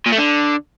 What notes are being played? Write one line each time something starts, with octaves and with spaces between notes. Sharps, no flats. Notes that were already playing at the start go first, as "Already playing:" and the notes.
A#2
A3
D3